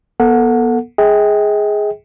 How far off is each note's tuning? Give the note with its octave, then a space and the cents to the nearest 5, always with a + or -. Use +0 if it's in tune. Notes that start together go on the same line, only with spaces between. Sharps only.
B3 -35 A4 +15 F#5 -20
G#4 +0 D#5 +45 G5 +0